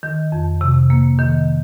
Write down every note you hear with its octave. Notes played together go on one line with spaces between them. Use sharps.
D#3
F2
C3
A#3
D#3